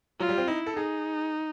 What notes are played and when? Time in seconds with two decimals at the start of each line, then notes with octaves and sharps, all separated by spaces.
0.20 F#3 F4
0.29 G3
0.38 C4
0.48 D#4 E4
0.66 A4
0.76 D#4 G#4